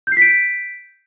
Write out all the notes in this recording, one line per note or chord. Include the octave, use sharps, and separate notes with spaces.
G6 B6 C7 D7